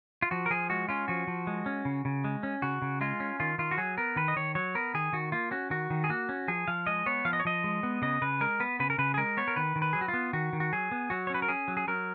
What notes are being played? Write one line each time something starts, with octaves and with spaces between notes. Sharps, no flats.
F4
F3 F#4
A#4
F3 G#4
G#3 F#4
C#4 F4
F3 F#4
F3
G#3
C#4
C#3
C#3
G#3
C#4
C#3 F#4
C#3
G#3 F4
C#4
D#3 F4
D#3 F4
F#4
F#3 G#4
B3 A#4
D#3 B4
D#5
D#3 C#5
F#3 C#5
B3 A#4
D#3 G#4
D#3 F#4
A#3 F4
C#4 F#4
D#3 F#4
D#3
G#4
A#3 F#4
C#4
F3 G#4
F3 F5
G#3 D#5
B3 C#5
F3 F5
D#5
C#5
F3 D#5
G#3
B3
C#3 D#5
C#3 B4
G#3 A#4
B3 B4
C#3 B4
A#4
C#3 B4
G#4
G#3 A#4
B3 C#5
A#4
D#3 B4
D#3
B4
F#3 G#4
F#4
F4
B3
D#3 F#4
D#3
F#4
F#3 G#4
B3
F#3 F#4
C#5
C#4 B4
A#4
C#4 G#4
F#3
G#4
F#3 A#4